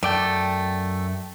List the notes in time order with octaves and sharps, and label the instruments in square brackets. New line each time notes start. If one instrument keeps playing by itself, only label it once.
[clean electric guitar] F#2 D5 G5 [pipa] A3